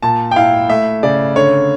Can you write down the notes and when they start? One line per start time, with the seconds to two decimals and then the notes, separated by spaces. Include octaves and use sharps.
0.02 A#2 A5
0.31 G5
0.36 E4 F5
0.70 A3 E5
1.03 C#3 D5
1.36 D3 C#5